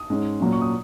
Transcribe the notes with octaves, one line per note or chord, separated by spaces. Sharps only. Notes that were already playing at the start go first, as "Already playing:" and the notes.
Already playing: D#6
G#2 G#3 C#4
A#2 F#3 C#4
C#6
D#6